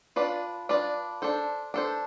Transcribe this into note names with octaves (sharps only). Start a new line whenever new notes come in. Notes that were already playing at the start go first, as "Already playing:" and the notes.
D4 F4 B4 D5
D4 F4 B4 D5
D4 A4 C5
D4 A4 C5